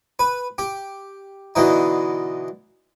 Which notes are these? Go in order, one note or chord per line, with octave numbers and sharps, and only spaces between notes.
B4
G4
B2 D3 E3 D#4